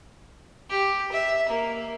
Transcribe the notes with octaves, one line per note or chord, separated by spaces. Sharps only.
G4
E5
A#3